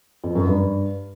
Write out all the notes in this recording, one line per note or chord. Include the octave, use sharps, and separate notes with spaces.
F2
F#2
G2